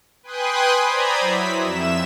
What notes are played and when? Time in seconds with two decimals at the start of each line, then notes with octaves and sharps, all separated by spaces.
0.23 B4 G5 G#5 C6 D#6 F#6
0.84 C5 D5 A#5 B5 D#6 G#6
1.20 F#3 E4 B6
1.60 F2 E5 E7